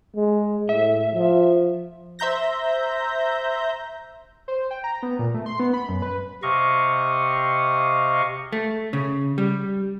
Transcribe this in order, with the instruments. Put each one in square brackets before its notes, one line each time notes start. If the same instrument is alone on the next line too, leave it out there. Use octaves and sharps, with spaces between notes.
[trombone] G#3
[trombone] A2 [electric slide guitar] E5
[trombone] F3
[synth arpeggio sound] C5 E5 A#5 G6 A#6
[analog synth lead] C5
G5
A#5
B3
A#2
A3
C6
B3
B5
F#2
B4
[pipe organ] C3 D#5 F5 C#6
[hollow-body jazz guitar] A3
C#3
G3